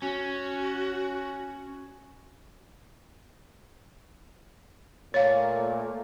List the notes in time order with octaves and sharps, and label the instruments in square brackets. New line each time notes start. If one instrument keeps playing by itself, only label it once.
[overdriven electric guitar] C#4 [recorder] F#4
[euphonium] A#2 [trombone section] A3 A#3 [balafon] C#5 F5